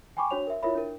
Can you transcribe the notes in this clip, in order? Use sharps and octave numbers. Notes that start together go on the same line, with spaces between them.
G5 G#5 B5 C#6 D6
D4 F#4 C5 C#5 F7
A#4 E5
E4 F4 A#4 C#5 E5 B5
D4 A#4